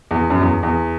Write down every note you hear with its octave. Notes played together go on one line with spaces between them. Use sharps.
E2
F#2
E2
E2